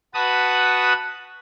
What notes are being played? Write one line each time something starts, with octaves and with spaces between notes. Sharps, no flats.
F#4 B4 F#5 A5 B5 D#6